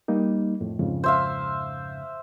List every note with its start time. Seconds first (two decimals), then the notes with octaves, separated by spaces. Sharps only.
0.08 G3 A#3 D#4
0.61 F2 A2
0.80 F2 G#2 C#3
1.04 C5 E5 F5